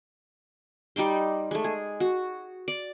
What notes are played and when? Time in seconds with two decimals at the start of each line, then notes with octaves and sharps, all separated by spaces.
0.96 G3 D#4 D5 C6
1.51 G#3 A3
1.64 G#4
2.00 F#4
2.68 D5